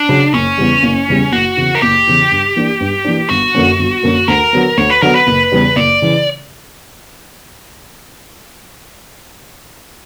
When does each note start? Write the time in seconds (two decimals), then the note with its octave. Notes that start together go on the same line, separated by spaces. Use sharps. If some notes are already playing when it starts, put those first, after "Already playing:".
Already playing: D4
0.09 C#3 F#3
0.34 F#1 C#4
0.58 E2 C#3 G3
0.83 F#1
1.08 E2 C#3 G3
1.32 F#1 F#4
1.56 E2 C#3 E3
1.75 A#4
1.82 F#1 G4
2.07 E2 C#3 E3
2.31 G2
2.56 E3 A#3 D4
2.80 G2
3.04 E3 A#3 D4
3.30 G1 F#4
3.54 F#2 D3 A#3 C#4
3.79 G1
4.03 F#2 D3 A#3 C#4
4.28 D2 A#4
4.53 D3 F#3 B3
4.77 D2 C#5
4.90 B4
5.02 D3 F#3 B3 A#4
5.15 B4
5.27 F#1
5.52 E2 C#3 E3 G3
5.76 F#1 D5
6.02 C#3 E3